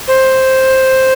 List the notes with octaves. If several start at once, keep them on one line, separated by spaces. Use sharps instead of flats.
C5